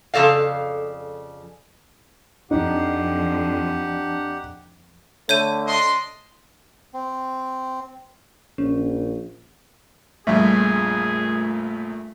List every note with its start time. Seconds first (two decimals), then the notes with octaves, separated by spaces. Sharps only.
0.14 F2 C#3 A4 D5 F5
2.51 F2 D4 D#4 G4 F#5
5.29 D3 A3 C#5 G6 D#7
5.67 D4 D#5 C6
6.94 C4
8.58 A#1 C#4
10.27 A#1 F2 A#2 G3 A3 G#4